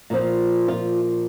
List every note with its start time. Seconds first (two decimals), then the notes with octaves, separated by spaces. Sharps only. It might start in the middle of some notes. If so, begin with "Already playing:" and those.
0.10 A#2 F3
0.68 F4